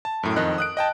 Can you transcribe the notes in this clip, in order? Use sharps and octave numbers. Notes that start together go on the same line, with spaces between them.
A5
F#2 A2
F2 D#3 D#5 F#6
D#6 F#6 D7
D#5 G5 A5